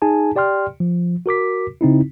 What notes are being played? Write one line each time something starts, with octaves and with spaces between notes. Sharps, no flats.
D#4 G#4 G#5 A5
G4 D5 G5 C6 F6
F3
F#4 A#4 D6 B6
C#3 C4 D#4 E4